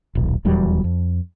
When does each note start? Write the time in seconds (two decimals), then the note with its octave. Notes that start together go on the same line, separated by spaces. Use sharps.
0.15 D#1 B1
0.45 D#1 E2 F#3 G3
0.84 F2